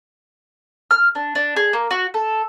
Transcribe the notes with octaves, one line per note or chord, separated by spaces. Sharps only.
F6
D4
D4
G#4
A#3
F#4
A4